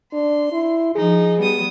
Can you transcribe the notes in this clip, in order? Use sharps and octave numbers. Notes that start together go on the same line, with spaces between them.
D4 C6
E4
F3 D#4 G#4
G3 B3 D#6